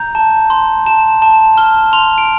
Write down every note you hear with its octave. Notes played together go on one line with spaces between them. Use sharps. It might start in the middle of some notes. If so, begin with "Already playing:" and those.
Already playing: A#5 G6
A5
C6
A5 E7
A5
F6 G7
C6 F7
D7